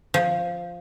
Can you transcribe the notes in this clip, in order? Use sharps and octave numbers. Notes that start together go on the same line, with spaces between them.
F3